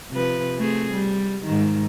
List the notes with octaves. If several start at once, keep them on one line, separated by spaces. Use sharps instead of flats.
C3 F3 B4
A3 C4 G#4
G3
G#2 D#3